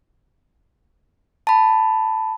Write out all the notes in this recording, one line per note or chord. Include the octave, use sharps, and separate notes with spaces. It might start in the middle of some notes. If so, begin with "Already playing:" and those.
A5 B5